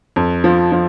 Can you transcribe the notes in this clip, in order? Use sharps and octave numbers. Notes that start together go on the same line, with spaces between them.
F2
F3
F3